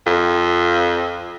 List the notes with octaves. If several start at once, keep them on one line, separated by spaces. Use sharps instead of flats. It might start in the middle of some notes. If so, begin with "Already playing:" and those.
F2